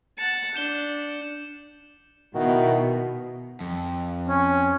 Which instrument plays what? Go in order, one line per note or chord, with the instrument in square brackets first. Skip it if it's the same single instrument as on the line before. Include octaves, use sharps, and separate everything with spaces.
[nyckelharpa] F#5 A5 [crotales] C#7
[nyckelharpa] D4 [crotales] G6 E7 G7
[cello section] B2 [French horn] D#3 [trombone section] E4 F#4
[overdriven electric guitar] F2
[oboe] C#4